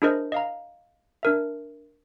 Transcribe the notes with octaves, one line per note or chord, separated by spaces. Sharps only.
D4 E4 G#4 A#4 C5 D#5
D#5 F5 A#5
D4 A#4 E5